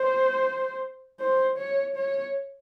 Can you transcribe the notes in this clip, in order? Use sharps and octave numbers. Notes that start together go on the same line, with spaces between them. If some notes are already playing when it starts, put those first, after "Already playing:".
Already playing: C5
C5
C#5
C#5